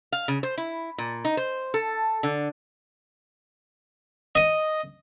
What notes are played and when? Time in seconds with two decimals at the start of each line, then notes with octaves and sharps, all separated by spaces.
0.12 F5
0.28 C#3
0.43 C5
0.58 E4
0.98 A#2
1.25 D#4
1.37 C5
1.74 A4
2.23 D3
4.35 D#5